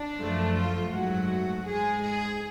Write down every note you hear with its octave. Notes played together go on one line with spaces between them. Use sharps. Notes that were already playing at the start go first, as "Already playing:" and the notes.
Already playing: D4
F#2 F3 A3
F4
G#2 F#3 A3 F#4
G#2 G#3 G#4
G#4